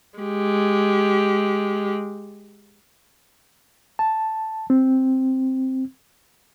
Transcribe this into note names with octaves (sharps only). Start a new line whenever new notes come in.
G#3 G4
A5
C4